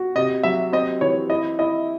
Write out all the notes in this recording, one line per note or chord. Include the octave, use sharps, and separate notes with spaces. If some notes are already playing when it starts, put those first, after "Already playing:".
Already playing: F#4
C3 D#5
F#3 E5
C4 D#5
E3 C#5
E4 D#5
E4 D#5